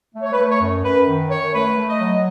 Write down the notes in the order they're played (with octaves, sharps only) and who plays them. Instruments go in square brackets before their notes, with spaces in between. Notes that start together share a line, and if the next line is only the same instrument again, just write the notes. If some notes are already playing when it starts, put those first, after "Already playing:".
[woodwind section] A3
C#5
B4
A3
B4
C#5
F#2
F#2 B4
D#3
F#2 C#5
A3 B4
A3
D#5
F#3